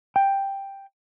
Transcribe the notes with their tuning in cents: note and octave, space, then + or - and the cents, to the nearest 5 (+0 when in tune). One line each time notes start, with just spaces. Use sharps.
G5 +5